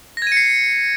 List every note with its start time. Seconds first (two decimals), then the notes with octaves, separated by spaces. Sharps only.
0.17 A#6
0.22 G#6
0.27 D#7
0.32 C#7
0.37 C7